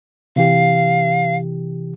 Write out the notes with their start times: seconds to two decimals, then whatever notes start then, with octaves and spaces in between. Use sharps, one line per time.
0.36 C3 E3 G4 F5